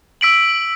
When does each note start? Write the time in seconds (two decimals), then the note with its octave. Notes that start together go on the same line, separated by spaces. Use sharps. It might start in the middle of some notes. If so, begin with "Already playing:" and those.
0.21 E6 B6 D7 F#7